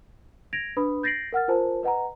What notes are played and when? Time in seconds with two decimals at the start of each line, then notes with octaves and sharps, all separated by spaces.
0.53 G#6 A#6 D7 F7
0.77 D4 B4 B5 D#6
1.03 G6 A6 A#6 C7 D7 F#7
1.32 A#4 F#5 F6 A6
1.48 F4 A#4 C5 G#5 A5
1.83 B4 D#5 F#5 G#5 A#5